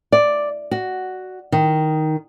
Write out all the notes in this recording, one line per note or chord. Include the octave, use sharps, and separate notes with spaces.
D5
F#4
D#3